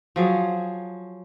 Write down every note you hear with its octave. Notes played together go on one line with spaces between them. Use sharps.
F3 F#3 G#4